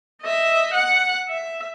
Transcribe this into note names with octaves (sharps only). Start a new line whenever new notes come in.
D#5 E5
F#5
E5